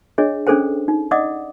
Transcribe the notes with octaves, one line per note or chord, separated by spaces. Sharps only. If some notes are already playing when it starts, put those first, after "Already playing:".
D4 G#4 C#5 D#5
C#4 D4 G#4 A4 C5 G5
D#4
D5 D#5 F#5 D6 D#6